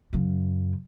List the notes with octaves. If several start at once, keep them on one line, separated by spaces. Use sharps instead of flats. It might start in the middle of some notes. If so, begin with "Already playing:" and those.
F#2 C#3